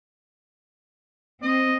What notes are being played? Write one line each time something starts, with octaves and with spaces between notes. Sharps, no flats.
C4 D#5